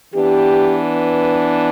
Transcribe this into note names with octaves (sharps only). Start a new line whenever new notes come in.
E3 B3 D4 G4